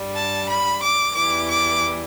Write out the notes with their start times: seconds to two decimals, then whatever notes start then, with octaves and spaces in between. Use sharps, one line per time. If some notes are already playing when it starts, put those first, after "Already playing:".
Already playing: G2 G3
0.15 A5
0.49 B5
0.82 D6
1.15 E2 E3 G3 D6
1.49 D6